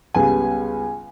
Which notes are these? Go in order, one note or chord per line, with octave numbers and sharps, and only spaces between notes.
C#2 C#3 G3 B3 G#5